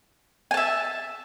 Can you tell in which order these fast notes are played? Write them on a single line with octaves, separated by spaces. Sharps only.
G#5 A5 E5